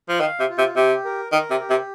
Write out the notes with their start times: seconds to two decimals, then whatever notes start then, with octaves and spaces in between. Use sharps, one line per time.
0.09 F3
0.20 D#3 F5
0.40 C3
0.49 F4
0.58 C3
0.76 C3 G4
1.05 A#4
1.32 D#3 A#4
1.50 C3
1.60 G4
1.70 C3